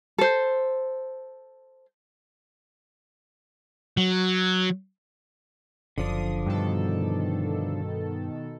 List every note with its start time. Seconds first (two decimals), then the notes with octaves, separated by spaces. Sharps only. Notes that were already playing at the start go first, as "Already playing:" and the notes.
0.18 A4 C5
3.97 F#3
5.98 F#1 D3 F3 D4 D#6
6.46 G2 B2 D#3 A4